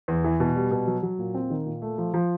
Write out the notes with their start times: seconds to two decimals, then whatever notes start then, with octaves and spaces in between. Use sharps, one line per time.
0.08 E2
0.24 E3
0.40 B2
0.56 G3
0.71 B2
0.87 F#3
1.03 F#3
1.19 A#2
1.35 C4
1.50 D#3
1.66 A#2
1.82 A3
1.98 F3
2.14 F3